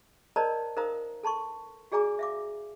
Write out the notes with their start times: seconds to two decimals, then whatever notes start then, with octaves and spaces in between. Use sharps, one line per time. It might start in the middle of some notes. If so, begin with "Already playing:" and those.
0.36 A#4 C5 D5 D#5 A5 A#5
0.76 D#4 A#4 C5 F5 A#5 D#6
1.23 A4 A5 C6 C#6
1.92 F#4 G#4 D5 G#5 A#5 D6
2.19 E5 F5 D6